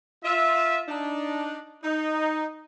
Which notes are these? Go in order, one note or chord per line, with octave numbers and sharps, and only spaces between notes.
F4 E5
D4 D#4
D#4